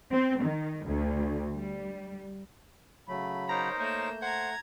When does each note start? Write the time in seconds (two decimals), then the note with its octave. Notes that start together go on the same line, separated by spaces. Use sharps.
0.12 C4
0.43 D#3
0.86 D2
1.56 G3
3.08 C#3 F#3 A3 B5
3.49 D#4 A#4 C5 C#5 A#5
3.80 A3 A#3 C#5 G6 E7
4.22 C5 F#5 A#5 G#6